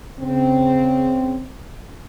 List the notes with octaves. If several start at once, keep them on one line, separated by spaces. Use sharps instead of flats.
C#3 C4